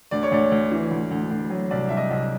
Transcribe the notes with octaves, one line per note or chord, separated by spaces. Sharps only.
D2 D5
C#5
D2 D5
D2
E3
D2
D2
D2
F#3
C2 D5
C2 E5
D#5
C2